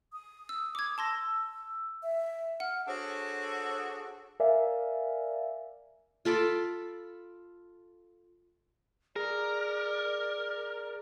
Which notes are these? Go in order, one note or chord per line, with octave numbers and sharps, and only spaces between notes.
D#6
E6
D6 G#6
A5 C6 E6 A#6
E5
F#5 F6
D4 F#4 G#4 A4 C5 C#5
A#4 D5 E5 F5 G#5
F4 A4 B5 D6
G#4 A#4 D5